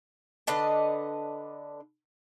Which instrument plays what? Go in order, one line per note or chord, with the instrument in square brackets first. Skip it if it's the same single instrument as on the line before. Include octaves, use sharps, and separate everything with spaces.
[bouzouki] D3 D4 B4 D#5